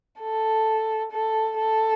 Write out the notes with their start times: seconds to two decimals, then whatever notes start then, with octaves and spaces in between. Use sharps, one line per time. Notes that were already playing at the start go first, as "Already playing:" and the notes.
0.21 A4
1.12 A4
1.58 A4